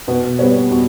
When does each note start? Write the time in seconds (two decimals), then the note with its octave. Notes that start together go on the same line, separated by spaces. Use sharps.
0.07 B2 B4
0.39 G3 B3 C#5
0.71 B2